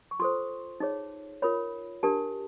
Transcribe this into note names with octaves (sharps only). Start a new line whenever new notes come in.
C#6
F4 A4 C5 C6
D#4 G#4 C#5
F4 A#4 C#5 B5
D4 G4 A#4 A5